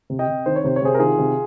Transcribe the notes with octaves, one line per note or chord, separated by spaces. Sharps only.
C3
D#5 G5
C3
D#3 C5
C#5
C3 C5
C#5
C3 G#4 C5
A#4
D#3 F4 G#4
C3